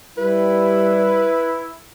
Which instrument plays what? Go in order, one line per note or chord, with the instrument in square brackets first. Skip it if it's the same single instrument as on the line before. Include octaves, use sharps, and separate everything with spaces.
[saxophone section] G3 [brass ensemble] E4 [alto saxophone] B4